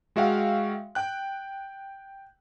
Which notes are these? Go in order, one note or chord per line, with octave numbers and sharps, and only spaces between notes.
G#3 F#4 E5 F5 G5
G5 F#6